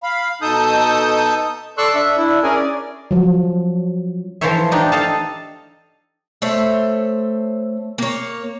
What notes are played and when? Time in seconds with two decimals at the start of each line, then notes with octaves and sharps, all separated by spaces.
0.03 F5 B5
0.42 B2 D#4 A4 A5 D#6 G6
1.78 A4 D5 C6 C#6 E6 F#6
1.95 D4 E5
2.17 D4 E4
2.43 C#4 G#4 A#4 G#5
2.55 D5
3.11 F3 F#3
4.41 E3 F3 A4 C5 C#5 E5
4.71 D4 D#4 G4 D5
4.92 A4 D#5 F5 A5
6.42 A3 C5 C#5 E5
7.98 A#3 C#5